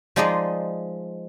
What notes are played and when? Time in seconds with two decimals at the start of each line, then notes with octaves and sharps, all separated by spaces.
0.16 F3 G#3 D#4 G#4 D5 D#5